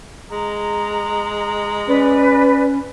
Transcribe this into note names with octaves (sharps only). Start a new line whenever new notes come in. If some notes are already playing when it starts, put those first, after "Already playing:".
G#3 A#5
C#4 B4 D5